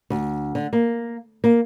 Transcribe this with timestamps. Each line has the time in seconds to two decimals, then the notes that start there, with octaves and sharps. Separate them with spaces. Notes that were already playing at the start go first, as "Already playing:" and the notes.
0.10 D2
0.55 D3
0.73 A#3
1.44 A#3